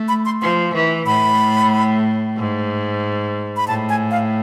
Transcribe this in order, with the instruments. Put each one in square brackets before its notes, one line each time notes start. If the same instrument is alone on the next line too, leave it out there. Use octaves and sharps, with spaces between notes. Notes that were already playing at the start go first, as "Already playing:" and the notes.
Already playing: [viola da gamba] A3
[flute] B5
C6
[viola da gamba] F3 [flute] C6
[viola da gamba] E3
[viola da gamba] A2 [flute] B5
[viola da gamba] G#2
[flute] B5
[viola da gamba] A2 [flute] A5
[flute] G#5
F5